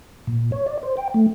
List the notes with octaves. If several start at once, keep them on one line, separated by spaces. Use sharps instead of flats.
A#2
C#5
D5
C5
G5
A3